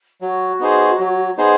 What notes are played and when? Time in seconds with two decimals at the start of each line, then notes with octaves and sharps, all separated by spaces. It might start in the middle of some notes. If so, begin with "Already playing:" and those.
0.22 F#3 F#4
0.60 B3 D#4 G#4 C5
0.99 F#3
1.38 B3 D#4 G#4 C5